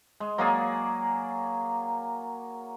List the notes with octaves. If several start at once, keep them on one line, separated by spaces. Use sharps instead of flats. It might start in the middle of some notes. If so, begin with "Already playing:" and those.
G#3
F#3 A#3 G#4 D5